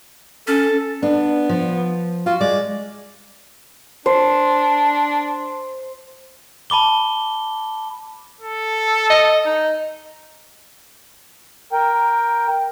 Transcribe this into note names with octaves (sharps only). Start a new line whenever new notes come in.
C#4 A4
B3 D4
F3
F4 F#4
G#3 D5
D4 C5
A5 B5 D6 G7
A4
D#5
D#4
A#4 G5